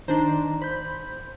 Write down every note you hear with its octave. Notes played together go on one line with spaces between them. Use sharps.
D#3 D4 D#4 C5 A#5
C5 B5 G6